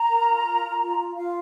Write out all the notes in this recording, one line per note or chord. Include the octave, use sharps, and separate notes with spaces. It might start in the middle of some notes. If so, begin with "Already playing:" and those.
Already playing: A#5
A#4
F4
A#4
F4
F4
F4
F4 F5